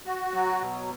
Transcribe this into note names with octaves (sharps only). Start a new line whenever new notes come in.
F#4
F#3
B2